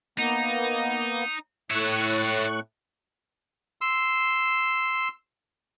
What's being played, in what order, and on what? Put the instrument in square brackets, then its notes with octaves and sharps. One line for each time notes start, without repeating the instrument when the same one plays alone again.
[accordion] A#3 B3 [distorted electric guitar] D#4
[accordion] A2 C#6 F#6 [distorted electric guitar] C#5 E5
[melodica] C6 E6